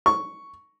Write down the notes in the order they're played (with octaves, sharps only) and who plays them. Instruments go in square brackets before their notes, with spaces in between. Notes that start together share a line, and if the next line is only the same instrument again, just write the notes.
[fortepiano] C#6